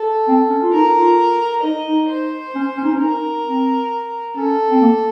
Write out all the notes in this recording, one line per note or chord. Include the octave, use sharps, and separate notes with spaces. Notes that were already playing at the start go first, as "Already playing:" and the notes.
Already playing: A4
C4
C#4
F4
D#4 A#4
F4
D#4 D#5
D#4
C5
C#4
C#4
D#4
C#4
D#4 A#4
C4
C#4 A4
C4
A#3